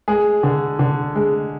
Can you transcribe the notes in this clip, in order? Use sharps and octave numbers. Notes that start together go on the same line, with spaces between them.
G#3 G#4
D3
D3
G#3